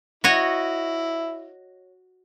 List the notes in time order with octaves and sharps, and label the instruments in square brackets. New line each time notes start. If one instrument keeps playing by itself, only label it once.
[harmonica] E4 [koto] F#4 C#5 D#5